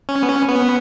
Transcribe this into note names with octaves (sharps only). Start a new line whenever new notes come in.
C#4
B3
C#4
B3